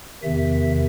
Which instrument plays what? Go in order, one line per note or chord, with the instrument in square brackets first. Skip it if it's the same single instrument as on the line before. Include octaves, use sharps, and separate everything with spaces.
[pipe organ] E2 C3 D#3 E5